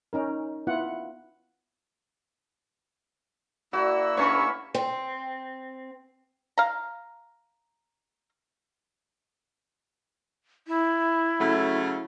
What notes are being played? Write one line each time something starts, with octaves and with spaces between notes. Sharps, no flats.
C#4 D#4 A#4
B3 E4 F4 F#5
A#3 E4 F#4 D5 E6
G2 A3 C#4 B4 C#5 C#6
C4
F5 A#5
E4
C#3 F#3 A3